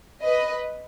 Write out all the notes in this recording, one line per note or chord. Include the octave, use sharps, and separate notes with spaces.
B4 D#5